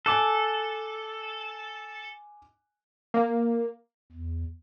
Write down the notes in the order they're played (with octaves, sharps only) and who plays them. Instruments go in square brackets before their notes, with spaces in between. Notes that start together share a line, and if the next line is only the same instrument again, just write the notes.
[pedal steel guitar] A4 [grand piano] G#5 D6 F#6
[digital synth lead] A#3
[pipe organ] E2